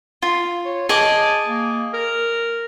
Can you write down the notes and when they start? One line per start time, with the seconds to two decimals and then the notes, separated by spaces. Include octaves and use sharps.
0.22 F4
0.65 C#5
0.89 G#4 D#5 A5 D6
1.47 A#3
1.94 A#4